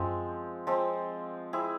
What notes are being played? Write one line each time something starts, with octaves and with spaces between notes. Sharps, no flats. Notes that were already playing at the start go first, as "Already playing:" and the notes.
Already playing: F#2 F3 G#3 C4
F3 G#3 C4
C4 E4 G#4